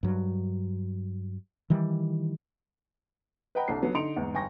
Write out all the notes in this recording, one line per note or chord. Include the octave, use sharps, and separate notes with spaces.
G2 F#3
D#3 E3 G3
B4 D#5 F#5 G5 A#5 B5
C2 D4 G4 A4 C7
F#3 B3 B4
D3 D#4 C6 C#7 D7 F7
E2 G#2
G1 G5 G#5 C#6 A#6